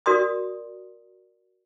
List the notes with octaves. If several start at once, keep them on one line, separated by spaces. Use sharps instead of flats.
F#4 A#4 D5 C6 D#6